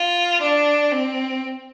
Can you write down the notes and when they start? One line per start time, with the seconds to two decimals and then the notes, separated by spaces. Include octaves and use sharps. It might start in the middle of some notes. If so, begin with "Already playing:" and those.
Already playing: F4
0.40 D4
0.92 C4